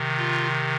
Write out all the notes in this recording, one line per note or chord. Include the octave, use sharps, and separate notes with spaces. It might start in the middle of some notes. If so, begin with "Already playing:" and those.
Already playing: C3 D#3
F4